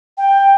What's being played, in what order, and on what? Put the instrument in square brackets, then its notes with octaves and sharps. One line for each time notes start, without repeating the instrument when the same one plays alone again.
[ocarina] G5